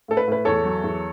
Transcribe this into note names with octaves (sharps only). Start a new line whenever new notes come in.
A2 A4
B4
A2 B4
E2 A4 C#5
F#3
E2